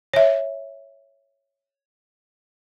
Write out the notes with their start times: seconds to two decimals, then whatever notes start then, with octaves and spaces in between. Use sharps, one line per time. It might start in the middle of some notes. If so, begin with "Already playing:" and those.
0.13 C#5 E5